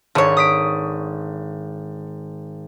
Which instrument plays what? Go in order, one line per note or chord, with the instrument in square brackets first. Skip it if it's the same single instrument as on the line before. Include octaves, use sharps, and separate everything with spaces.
[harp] G#1 [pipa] D3 C#5
[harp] D#6 B6 D7